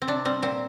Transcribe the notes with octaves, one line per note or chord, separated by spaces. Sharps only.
C4
C3 D4
G3 C4
A#2 C4